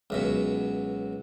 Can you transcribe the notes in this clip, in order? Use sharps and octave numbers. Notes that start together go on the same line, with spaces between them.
C#2 F#2 B2